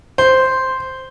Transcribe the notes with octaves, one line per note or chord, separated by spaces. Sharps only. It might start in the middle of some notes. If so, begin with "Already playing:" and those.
C5